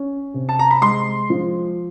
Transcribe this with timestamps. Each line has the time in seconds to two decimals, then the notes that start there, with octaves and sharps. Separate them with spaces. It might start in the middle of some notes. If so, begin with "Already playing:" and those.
Already playing: C#4
0.34 C3
0.49 A5
0.59 A#5
0.71 B5
0.82 G#3 C6
1.30 F3